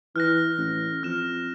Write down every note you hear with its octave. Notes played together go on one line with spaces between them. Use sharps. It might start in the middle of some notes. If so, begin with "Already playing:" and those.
E3 F6 F#6 A#6
A1
F2 F6 E7